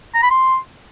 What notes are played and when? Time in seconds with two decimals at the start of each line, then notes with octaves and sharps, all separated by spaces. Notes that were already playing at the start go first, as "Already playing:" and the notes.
0.15 A#5
0.23 B5
0.31 C6